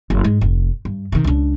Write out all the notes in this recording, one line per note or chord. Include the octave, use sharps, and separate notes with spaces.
F#1
G#2 G#3
F1
G2
C3 D#3
C#2 D4